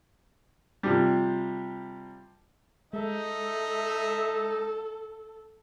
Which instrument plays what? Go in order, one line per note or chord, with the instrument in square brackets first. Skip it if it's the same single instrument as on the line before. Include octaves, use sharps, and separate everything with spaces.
[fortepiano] C3 F3 G3
[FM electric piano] G#3 [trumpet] D#4 [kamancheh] A4 [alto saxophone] E5